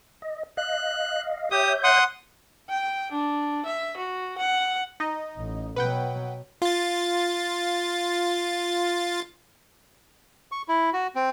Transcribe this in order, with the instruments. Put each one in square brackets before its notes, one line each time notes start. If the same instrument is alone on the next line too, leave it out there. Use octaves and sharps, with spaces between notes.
[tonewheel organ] D#5
[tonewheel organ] D#5 F5 [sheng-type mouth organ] F#6
[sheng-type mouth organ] G4 D#6 [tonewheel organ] C#5 E5 G6
[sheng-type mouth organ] F#5 C6 D#6
[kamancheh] G5
D4
E5
F#4
F#5
[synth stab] D#4 D#5
[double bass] A1
[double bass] B2 F#3 [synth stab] B4 F#5 G5
[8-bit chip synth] F4 A6
[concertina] C#6
E4
F#4
C4